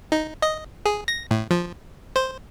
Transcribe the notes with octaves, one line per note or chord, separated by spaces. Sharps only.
D#4
D#5
G#4
A#6
A2
F3
C5